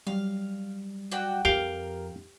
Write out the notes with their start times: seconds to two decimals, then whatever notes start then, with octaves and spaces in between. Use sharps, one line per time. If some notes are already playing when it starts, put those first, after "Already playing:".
0.07 F#3 G3 F5
1.12 F#4 D5 G5
1.45 F2 G4 A#4 F5 G5